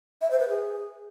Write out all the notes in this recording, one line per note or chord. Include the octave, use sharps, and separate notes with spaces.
E5
C5
B4
G#4